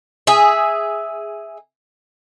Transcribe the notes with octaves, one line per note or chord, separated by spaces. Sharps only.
G#4 E5